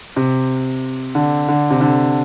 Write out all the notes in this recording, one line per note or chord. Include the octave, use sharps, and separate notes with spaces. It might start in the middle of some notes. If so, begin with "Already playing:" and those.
C3
D3
D3
C3
D3